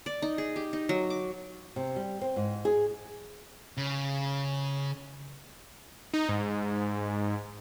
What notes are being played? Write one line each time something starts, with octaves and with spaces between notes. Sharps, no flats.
D5
D#4
G#4
G4
D#4
F#3
D6
C3
G3
C4
G#2
G#4
C#3
D#4
G#2